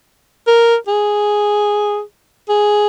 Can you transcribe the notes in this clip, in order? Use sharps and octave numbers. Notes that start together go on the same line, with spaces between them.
A#4
G#4
G#4